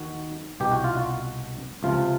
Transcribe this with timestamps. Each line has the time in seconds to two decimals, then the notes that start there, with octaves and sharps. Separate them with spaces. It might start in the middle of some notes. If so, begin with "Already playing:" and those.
Already playing: D#2 D#3 F#4
0.60 C2 B2 G4
0.72 F#4
0.84 F4
0.95 F#4
1.83 C#2 C3 F3 F4